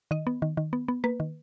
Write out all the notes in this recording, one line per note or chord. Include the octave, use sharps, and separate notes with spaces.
D#3 D#5
B3
D#3
D#3
B3
B3
A#3 B4
D#3